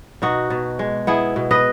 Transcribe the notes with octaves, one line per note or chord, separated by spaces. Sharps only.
B2 D#4 F#4
B2
G#3
B3 E4 G#4
B2
B4 D#5